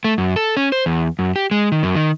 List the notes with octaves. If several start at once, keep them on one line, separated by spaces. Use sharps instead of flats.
A3
F#2
A4
C#4
C5
E2
F#2
G4
G#3
D#3
F#2
D#3